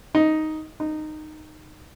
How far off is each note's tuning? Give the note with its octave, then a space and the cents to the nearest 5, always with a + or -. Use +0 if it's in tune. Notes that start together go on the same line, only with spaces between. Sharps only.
D#4 +5
D#4 -15